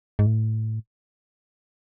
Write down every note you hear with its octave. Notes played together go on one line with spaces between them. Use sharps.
G#2
A2